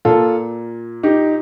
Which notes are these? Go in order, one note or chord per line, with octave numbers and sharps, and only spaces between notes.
A#2 F4 A4
D#4 G4